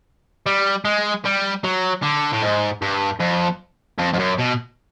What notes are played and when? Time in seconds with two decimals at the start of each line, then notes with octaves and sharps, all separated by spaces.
0.46 G3
0.85 G#3
1.25 G3
1.64 F#3
2.03 D3
2.32 A2
2.42 G#2
2.82 G2
3.20 F2
3.99 F2
4.13 F2
4.19 F#2
4.38 B2